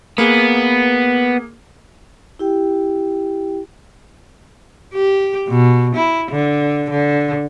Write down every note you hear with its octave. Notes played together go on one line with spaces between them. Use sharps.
A#3 B3 G#4
E4 G4 G5
G4
B2
E4
D3
D3